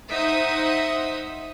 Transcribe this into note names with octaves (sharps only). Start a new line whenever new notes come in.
D#4 C5 E5 F#5 D#6